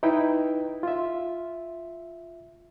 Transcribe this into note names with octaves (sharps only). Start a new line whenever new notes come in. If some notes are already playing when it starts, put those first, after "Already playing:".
D#4 E4 B4 G5
F4 E5